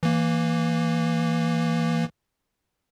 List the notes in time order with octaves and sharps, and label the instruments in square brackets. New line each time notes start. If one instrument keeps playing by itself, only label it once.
[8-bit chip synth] E3 A#3